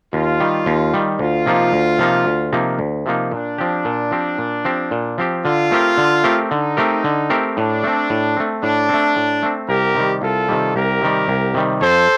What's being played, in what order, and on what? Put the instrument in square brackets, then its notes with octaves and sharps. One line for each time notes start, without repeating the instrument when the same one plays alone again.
[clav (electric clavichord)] D#2 [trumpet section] F4
[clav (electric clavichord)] D#3 G3
D#2
D#3 G3
[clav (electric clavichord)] D2 [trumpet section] F4
[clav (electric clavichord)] C3 F3 A#3 D#4
D2
C3 F3 A#3 D#4
D2
C3 F3 A#3 D#4
D2
C3 F3 A#3 D#4
[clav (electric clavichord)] A#2 [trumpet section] D4
[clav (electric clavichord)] F3 C4 G4
A#2
F3 C4 G4
A#2
F3 C4 G4
A#2
F3 C4 G4
[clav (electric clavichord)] D3 [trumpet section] F4
[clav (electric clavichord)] A3 C4 G4 A#4
D3
A3 C4 G4 A#4
[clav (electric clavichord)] D3 [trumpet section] D#4
[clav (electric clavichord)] A3 C4 G4 A#4
D3
A3 C4 G4 A#4
[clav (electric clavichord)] A2 [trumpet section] D4
[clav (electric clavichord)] A3 C4
A2
A3 C4
[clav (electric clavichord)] A2 [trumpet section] D4
[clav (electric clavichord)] A3 C4
A2
A3 C4
[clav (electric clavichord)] C2 [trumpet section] G4 A#4
[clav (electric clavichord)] C3 D#3 G3
[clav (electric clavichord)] C2 [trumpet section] F4 A4
[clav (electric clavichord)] C3 D#3 G3
[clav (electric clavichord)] C2 [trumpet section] G4 A#4
[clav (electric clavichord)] C3 D#3 G3
C2
C3 D#3 G3
[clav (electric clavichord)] F2 [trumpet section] A4 C5